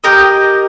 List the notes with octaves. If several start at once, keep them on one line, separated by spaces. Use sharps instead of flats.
G4 A#4 D#5